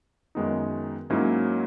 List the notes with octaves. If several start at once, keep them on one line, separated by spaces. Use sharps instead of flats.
F#2 D#3 G#3 B3 D#4
G#2 F#3 A#3 C#4 E4